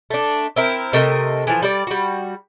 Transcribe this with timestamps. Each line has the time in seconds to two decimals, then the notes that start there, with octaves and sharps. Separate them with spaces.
0.10 A3 D4
0.56 C4 E4 A#4
0.93 C3 A3 A#4 D#5
1.47 E3 F3
1.62 G3 D5
1.87 G3 F#4